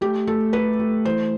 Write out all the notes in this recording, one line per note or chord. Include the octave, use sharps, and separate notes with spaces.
A3 G4
A3 A4
A3 B4
A3
E3 C5